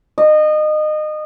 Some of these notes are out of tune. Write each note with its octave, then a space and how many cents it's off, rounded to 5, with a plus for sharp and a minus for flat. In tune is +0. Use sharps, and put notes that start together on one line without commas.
D#5 -25